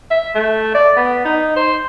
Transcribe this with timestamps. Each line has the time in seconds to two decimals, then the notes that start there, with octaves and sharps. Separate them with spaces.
0.11 E5
0.35 A3
0.75 D5
0.97 B3
1.25 D#4
1.56 C5